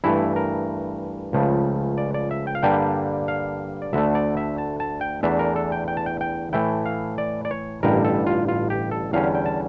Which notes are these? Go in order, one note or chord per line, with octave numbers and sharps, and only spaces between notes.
G2 E3 A3 E4
A#4
C#2 C#3 F3 A3
D5
D5
E5
G5
F5
G2 D3 G3 A#3 D4 G5
F5
D5
D2 D3 A3 E5
D5
E5
A5
A5
G5
E2 E3 A3 D4 E5
A#4
A4
G5
G5
A5
G5
G5
A2 E3 A3 E4 G5
F5
D5
D5
C#5
A1 G2 D3 G3 A#4
A4
F4
F4
G4
A4
E2 D3 G3 C#4 F5
G5
A5